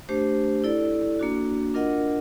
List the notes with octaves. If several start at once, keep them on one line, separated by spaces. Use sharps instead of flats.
A3 D4 G4 C5
E4 A4 D5
A#3 D4 F#4
D4 F4 A#4 D#5 F#5